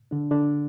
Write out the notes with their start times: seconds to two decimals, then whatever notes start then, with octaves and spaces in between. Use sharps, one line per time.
0.11 D3 D4
0.31 D3 D4